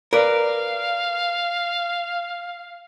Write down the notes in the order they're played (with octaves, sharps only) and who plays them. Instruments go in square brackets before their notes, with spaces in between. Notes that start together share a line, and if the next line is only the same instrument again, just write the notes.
[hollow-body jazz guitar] A#4 B4 D5 [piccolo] F5